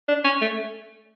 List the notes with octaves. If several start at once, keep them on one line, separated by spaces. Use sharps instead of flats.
D4
C#4
A3